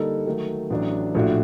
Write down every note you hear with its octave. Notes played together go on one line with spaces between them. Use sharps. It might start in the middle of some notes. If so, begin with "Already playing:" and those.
Already playing: D3 G3 A#3 D#4 A4
D#3 F#3 A3
A1 A2 F#3 A3 D4
A#1 A2 A3 D4 F#4